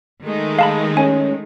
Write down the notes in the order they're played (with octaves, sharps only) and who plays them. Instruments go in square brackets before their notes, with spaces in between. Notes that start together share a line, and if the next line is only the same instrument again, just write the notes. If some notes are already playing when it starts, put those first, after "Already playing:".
[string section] D#3 G#3 A3
[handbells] F5 A5 B5
[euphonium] C#4 [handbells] G#5